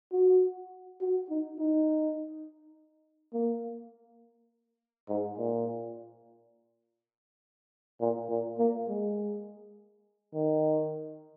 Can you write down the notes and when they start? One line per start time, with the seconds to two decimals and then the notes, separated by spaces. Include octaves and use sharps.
0.12 F#4
1.01 F#4
1.30 D#4
1.59 D#4
3.33 A#3
5.09 G#2
5.38 A#2
8.01 A#2
8.29 A#2
8.58 A#3
8.88 G#3
10.34 D#3